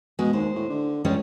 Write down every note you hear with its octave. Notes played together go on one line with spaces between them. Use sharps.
B2 G#3
D#2 C5
A2
D3
C#2 G3 G#3 C#4